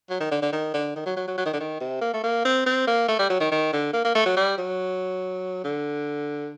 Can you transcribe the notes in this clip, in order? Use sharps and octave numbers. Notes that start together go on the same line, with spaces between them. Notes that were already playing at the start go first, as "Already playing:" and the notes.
F#3
D#3
D3
D3
D#3
D3
D#3
F#3
F#3
F#3
F#3
D#3
D3
D#3
C3
A#3
A3
A#3
C4
C4
A#3
A3
G3
F#3
D#3
D#3
D3
A#3
A#3
A3
F#3
G3
F#3
D3